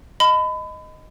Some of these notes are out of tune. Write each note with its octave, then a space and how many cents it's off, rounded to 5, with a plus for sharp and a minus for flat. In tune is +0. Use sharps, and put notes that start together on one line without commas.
D#5 +0 B5 +30